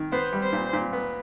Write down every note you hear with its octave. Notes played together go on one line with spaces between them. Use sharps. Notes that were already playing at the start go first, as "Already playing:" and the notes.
Already playing: D#3
B3 C5
G3
C5
A#2
A#2
B3